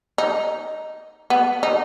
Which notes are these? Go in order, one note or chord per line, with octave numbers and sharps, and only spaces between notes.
D#4
B3
D#4